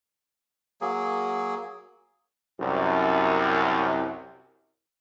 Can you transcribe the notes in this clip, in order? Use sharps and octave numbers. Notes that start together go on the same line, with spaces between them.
F#3 A#3 G#4
C2 F#2